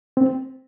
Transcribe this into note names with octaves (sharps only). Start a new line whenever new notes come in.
C4